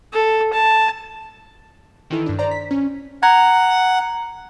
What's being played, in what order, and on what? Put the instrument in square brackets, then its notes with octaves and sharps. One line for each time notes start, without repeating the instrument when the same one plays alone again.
[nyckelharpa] A4
A5
[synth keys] D#3 E3 E4 A4
G2 D4
C5 D5 A#5
B6
C#4
[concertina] F#5 [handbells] A#5 G#6